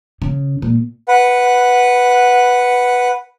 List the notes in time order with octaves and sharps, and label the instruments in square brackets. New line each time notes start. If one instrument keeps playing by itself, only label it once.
[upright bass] C#3
A#2
[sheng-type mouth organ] B4 F#5